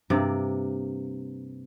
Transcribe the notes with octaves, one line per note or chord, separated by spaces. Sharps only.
G2 C3 A#3 D5